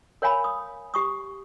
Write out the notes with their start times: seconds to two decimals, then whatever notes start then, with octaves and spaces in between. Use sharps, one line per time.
0.22 A#4 C#5 F5 G#5 B5
0.44 D#6
0.94 G4 C#6 D#6